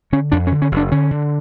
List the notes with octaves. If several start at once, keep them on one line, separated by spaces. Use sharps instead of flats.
D3 C#4
F2 D4
C#4
D3
C#4
F#1
D4
D3 C#4
D3